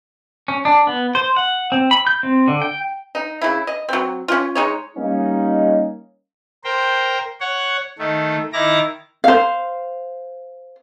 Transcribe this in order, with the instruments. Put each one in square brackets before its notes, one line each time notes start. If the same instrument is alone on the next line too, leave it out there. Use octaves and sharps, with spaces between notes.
[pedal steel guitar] C#4
D4
B3
C5
F#5
C4
B5
G6
C4
D3
G5
[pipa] D#4
C#3 E4
D#5
F#3 C4
C#4 F4
G#3 D#4 C#5
[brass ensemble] G3 A#3 C#4 D#4
[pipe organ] A#4 C5 G5
C#5 F#5
D#3 A3
D#3 E4 A#5 D6 A#6
[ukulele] C5 F5